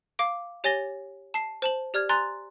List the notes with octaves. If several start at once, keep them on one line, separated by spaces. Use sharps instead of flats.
F5 D6 D7
G4 C#5 G#5 A6 A#6 G7
A5 C7
C5 A5 F#7
G4 D5 F6 G#6
G#5 A#5 C6 F#6 A6 F7